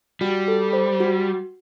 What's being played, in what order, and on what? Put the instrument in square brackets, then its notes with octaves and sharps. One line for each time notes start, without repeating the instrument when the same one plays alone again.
[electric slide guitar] G3 [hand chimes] F#4
[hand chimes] A4
C5
F#4